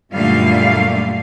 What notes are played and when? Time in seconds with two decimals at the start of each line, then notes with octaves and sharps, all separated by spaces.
0.14 F#2 A#2 D3 G3 A3 F5